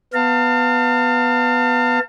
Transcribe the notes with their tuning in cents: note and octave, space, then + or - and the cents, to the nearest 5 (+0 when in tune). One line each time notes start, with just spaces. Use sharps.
B3 +0 F5 +0 A5 +40